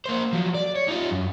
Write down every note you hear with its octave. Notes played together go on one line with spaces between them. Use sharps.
A#3 C5
F3 F#3
D5
C#5
D#4 F4
F#2